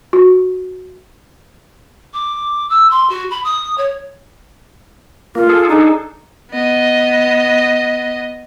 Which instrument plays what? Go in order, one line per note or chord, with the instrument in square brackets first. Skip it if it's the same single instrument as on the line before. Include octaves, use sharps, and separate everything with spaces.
[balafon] F#4
[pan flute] D6
E6
C6
F#4
B5
D#6
C#5
[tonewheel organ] A#3 [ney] F4
[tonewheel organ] G#4 A4
[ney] D4 [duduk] D#4
[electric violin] B3 D#5